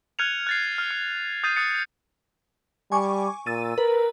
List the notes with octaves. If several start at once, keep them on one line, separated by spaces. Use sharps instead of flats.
F6 F#6 G#6 C#7 D#7 F7
F#6 A6 C7
F6
F6 C#7
D#6 G6 A6 C7 D#7
D#6 F#6 A6 C#7 D#7
G3 G#5 C#6 D6
A#2 E6 A6 D#7
A#4 B4